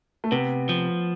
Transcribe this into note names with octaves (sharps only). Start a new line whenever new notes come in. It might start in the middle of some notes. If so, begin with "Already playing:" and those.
A3
C3 B3
F3